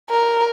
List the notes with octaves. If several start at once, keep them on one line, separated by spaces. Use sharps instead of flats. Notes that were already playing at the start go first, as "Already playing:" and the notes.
A#4